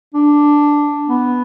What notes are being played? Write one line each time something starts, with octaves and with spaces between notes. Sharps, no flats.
D4
B3